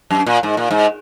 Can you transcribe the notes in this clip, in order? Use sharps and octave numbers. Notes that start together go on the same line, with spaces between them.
F#2
A#2
G#2
A#2
G#2